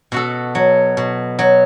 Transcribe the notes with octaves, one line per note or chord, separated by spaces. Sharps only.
B2 F#4 A4
F#3
B2
F#3